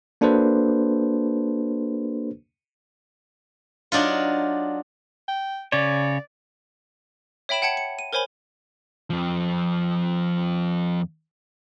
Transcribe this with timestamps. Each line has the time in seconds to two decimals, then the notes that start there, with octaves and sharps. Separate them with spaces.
0.21 A#3 D4 F#4 A4 B4 C5
3.92 F#3 D4 D#4 F4
5.28 G5
5.72 C#3 C#5 D5
7.49 C#5 E5 G5 B5 D7 E7
7.62 F#5 G5 A5 G#6 C#7 F#7
7.77 C#7
7.99 D#7
8.13 A#4 C5 C#5 G#5 B5 G7
9.10 F2 F3